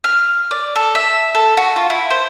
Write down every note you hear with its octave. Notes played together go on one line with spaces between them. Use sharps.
F6
D5
A4
E5
A4
F#4
F4
E4
C5